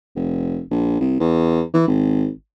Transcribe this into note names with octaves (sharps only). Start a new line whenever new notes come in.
F1
A#1
C2
E2
E3
G#1